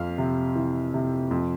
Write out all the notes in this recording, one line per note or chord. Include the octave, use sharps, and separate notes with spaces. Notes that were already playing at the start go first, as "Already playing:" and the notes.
Already playing: F2 F5
C3
E3
C3
F2